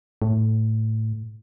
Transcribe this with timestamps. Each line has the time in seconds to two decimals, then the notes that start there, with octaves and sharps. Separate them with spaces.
0.22 A2